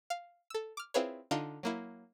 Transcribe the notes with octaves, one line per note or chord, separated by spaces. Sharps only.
F5
A4 E6
D6 F6
C4 E4 F4 G#4 B4 C#5
D3 D4 D#4 F4
F#3 A#3 E4